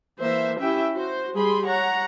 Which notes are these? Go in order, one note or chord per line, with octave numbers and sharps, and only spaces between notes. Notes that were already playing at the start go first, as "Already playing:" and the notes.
E3 A#3 C5 E5
C#4 E4 G4 E5 G5
F#4 C5
G3 G4 G#4 B5 C6
C#5 F#5 A#5